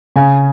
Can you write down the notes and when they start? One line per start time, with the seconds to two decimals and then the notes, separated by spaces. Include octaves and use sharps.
0.16 C#3 G#5